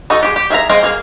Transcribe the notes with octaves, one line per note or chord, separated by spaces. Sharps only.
D#4 F#4 A4 D#5
G4 G#4
G4
G#4 E5 F5 A#5
G#4 C5 D#5 F5 G5
A#3 G#4 F5